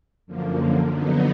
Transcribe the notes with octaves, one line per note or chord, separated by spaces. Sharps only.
F#2 D3 F3 A#3
D3 F#3 B3 D#4